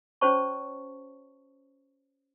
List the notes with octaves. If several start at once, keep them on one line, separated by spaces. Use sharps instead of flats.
C#4 F#4 C5 C#5 A5 C#6